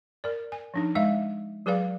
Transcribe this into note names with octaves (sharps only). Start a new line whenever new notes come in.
A#4 D5
G#5
F3 D4 D#4
G#3 E5 F5
F#3 G#4 B4 D5 F5